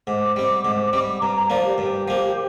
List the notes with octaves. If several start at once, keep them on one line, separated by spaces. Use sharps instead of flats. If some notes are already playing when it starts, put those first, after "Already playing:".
G#2 D6
G3 C4
G#2
G3 C4
G2 A#5
A#5
F3 A#3 D5
G4
G2
F3 A#3